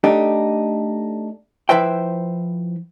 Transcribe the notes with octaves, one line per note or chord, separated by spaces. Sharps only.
A3 D4 D#4 G4 A4
F3 E4 B4 C5 E5 G5